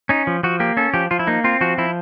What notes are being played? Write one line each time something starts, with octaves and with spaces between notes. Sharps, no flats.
C#4 D#4
F3
F3 F#4
A#3 G4
C#4 A4
F3 G4
F3 F4
E4
A#3 D#4
C4 F4
F3 F#4
F3 E4